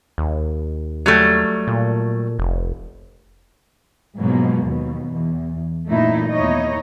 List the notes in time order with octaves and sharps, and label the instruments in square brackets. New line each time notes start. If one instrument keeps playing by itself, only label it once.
[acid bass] D#2
[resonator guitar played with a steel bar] F#3 G3 A3
[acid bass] A#2
F1
[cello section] G#2 B2 F3 F#3 G#3 A#3
D#2 B2
E2
F#2 A#2 E3 A3 D#4 E4
D#2 B3 D#4 E4 C#5 D#5